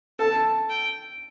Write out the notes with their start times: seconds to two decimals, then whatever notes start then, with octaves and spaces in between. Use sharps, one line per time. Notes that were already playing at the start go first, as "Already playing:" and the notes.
0.19 A4 A5
0.70 G5